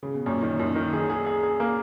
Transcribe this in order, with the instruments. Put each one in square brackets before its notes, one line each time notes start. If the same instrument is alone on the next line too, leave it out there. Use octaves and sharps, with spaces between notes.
[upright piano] C#3
B2
[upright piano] F#2 A#2 [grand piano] C#4
[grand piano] D#3
[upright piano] F#2 [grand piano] D#3
[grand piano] D#3
G#4
G#4
G#4
G#4
A#3